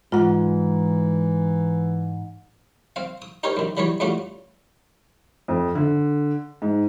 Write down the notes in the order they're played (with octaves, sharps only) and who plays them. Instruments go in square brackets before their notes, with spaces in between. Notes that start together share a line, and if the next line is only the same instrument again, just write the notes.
[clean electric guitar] G#2 [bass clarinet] E3 [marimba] F4 F#5
[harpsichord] C4 F5
D#6
D#4 G4 A#4 C5 C#5 G#5
F#2 D#3
E3 F#3 G3 B3 C#5
E2 G3 A3 C#4 F4 F#4
[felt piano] F2
D3
G#2